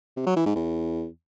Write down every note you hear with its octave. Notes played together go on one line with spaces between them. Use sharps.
C3
F#3
E3
G#2
E2